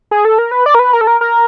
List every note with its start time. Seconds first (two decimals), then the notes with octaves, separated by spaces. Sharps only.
0.11 G#4
0.25 A4
0.38 A#4
0.51 B4
0.66 D5
0.74 A#4
0.79 B4
0.93 A#4
1.01 A4
1.07 A#4
1.21 A#4